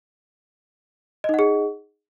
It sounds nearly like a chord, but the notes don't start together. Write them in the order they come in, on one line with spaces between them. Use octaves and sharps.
D#5 D#4 F#5 G#4